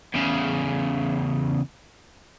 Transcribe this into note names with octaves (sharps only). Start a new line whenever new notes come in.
E2 C#3